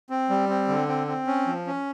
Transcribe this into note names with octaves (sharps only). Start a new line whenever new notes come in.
C4
G3
C4
D3
C4
C4
C#4
F3
C#4